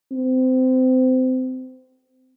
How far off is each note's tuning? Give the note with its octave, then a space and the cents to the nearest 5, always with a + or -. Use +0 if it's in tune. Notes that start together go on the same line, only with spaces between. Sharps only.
C4 -25